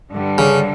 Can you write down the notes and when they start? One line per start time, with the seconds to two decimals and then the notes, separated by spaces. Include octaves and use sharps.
0.11 G2 D3 G3
0.38 C#3